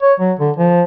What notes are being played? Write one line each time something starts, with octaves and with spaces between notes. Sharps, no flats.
C#5
F#3
D3
F3